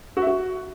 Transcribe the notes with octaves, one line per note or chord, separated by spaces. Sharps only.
F#4
E5
F#4